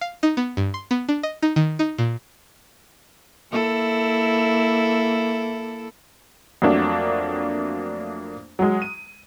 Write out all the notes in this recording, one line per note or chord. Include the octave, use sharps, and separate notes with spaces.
F5
D#4
B3
G2
C6
B3
D4
D#5
D#4
D#3
D#4
A#2
A#3 E4 A4
F2 F#3 A3 A#3 D4
F#3 G#3
D#7